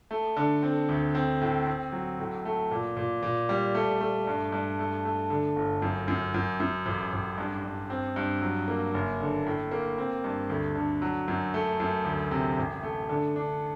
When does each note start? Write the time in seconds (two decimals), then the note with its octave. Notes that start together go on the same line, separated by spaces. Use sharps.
0.11 A3
0.37 D3
0.63 C4
0.89 D2
1.15 C4
1.41 A2
1.67 C4
1.92 F#3
2.19 A2
2.45 A3
2.71 A#2
2.97 A#2
3.23 A#2
3.49 G3
3.75 A3
4.01 A3
4.27 G2
4.52 G2
4.79 A3
5.05 A3
5.30 D3
5.56 G1
5.82 F#2
6.08 F#2
6.34 F#2
6.60 F#2
6.86 A1
7.13 A1
7.38 G2
7.64 G2
7.90 C4
8.16 G2
8.42 F#3
8.68 A#3
8.94 F#1
9.20 D3
9.46 A2
9.71 A#3
9.98 C4
10.24 G2
10.50 D2
10.75 D3
11.02 F#3
11.28 F#2
11.54 A3
11.80 F#2
12.05 D2
12.31 C3
12.57 A1
12.83 A3
13.09 D3
13.36 D4